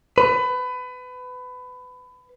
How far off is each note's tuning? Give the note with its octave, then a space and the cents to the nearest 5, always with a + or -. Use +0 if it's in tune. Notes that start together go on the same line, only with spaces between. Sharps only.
B4 +25